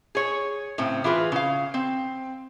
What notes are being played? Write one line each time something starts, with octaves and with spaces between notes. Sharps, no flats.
G#4 C#5
A2 C#3 C4
E3 F4 G#4 B4
C#3 F5
C4